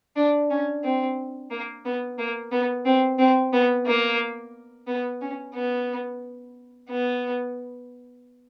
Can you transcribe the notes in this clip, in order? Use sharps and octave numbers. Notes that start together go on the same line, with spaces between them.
D4
C#4
C4
A#3
B3
A#3
B3
C4
C4
B3
A#3
B3
C#4
B3
B3